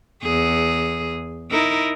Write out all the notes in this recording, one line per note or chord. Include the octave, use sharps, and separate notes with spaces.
E2 G#4
D#4 E4 A#4